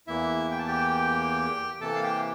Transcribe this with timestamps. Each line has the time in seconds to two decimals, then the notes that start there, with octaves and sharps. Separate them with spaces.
0.07 E2 E3 A#3 E4 E5
0.51 G5
0.59 A5
0.68 G4 G5
1.81 C3 E3 A#3 A4 A5
1.96 F5
2.03 G4 G5